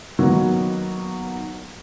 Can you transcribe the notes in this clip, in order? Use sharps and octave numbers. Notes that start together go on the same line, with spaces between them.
D#3 F#3 A#3 B3